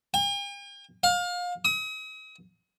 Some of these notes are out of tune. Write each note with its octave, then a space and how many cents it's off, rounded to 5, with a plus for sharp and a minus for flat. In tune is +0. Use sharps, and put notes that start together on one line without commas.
G5 +45
F5 +30
D#6 +40